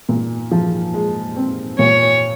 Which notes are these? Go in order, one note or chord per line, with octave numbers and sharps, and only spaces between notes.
A#2
F3
G#3
C4
A#2 C#5